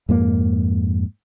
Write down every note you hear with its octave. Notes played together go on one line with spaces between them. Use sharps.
F2 G#2 A#3